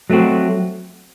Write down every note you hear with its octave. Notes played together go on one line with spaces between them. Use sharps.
F#3 A3 C4 F#4